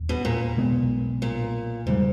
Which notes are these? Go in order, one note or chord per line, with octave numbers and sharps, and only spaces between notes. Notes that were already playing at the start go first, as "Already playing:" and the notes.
Already playing: E1 D#2
B2
A#2
B1 B2 G#3 B3
A#2
E1 G#2 C#3 G3